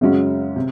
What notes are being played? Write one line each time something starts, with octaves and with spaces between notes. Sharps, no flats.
F#2 C#3 G#3 C#4 F#4
C3